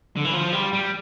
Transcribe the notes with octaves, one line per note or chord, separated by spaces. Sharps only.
D3
E3
F3
G3
G3